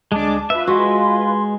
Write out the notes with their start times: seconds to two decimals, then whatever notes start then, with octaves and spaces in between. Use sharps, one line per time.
0.12 D2 G#3 D4 A5 D6
0.50 F4 B4 E5
0.67 G#3 F#4 C6